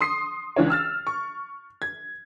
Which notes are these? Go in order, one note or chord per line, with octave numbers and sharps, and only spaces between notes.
C6 D#6 C7
C#2 E3 D4 C#5
E6 F6 A6
C#6
G#6